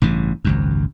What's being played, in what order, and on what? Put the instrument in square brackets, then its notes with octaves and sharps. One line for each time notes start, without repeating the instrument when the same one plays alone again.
[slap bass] A1 G2 C#3 E3
G#1 C#2 F#2